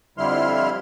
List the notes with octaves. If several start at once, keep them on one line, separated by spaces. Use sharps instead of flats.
F2 D3 G3 E4 C6 F6